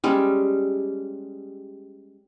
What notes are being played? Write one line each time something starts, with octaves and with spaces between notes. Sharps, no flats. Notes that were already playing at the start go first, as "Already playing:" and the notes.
G3 G#3 C#4 A4